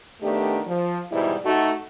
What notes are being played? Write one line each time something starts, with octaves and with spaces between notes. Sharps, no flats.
D#3 A3 B3 D4 G4
F3
G#2 B2 E3 G3 E4
A3 D#4 F#4